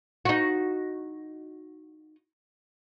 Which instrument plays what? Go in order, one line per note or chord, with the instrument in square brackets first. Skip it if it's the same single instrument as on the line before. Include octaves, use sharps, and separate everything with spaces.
[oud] D#4 F#4